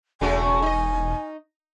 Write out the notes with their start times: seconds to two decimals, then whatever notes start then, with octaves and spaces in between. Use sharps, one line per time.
0.21 E1 C#3 A3 F#4 G#5
0.62 D#4 D#5